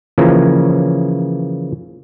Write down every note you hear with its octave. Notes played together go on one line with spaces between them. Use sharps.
C#3 E3 F3 A#3 C#4